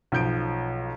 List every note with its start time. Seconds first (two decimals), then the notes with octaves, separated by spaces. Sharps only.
0.12 B1 F3 G6 D7